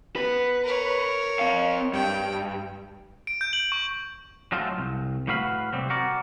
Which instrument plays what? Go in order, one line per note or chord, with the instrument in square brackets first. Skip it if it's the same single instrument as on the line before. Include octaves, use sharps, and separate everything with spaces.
[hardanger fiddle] B3 [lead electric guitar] B4
[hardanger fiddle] A#4 C#5
[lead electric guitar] C4 F5
[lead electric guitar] G2 [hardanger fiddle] G5
[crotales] D7
G6
F#7
C#6
[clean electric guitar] F#3 G#3 A3 C4 F4 A4
C2
A2 A3 F#4 B4 F5 B5
C3 G3 C4
F#4 A#4 D5